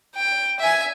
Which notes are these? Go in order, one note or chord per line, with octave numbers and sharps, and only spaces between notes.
G5
E5 G#5